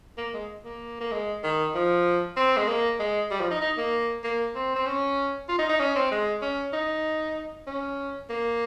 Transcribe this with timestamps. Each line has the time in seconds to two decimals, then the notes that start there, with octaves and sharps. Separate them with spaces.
0.18 A#3
0.34 G#3
0.65 A#3
1.01 A#3
1.12 G#3
1.43 D#3
1.74 F3
2.37 C4
2.57 G#3
2.68 A#3
2.99 G#3
3.31 G3
3.41 F3
3.51 D#4
3.61 D#4
3.78 A#3
4.24 A#3
4.55 C4
4.76 C4
4.86 C#4
5.49 F4
5.59 D#4
5.69 D#4
5.80 C#4
5.96 C4
6.11 G#3
6.42 C#4
6.73 D#4
7.67 C#4
8.30 A#3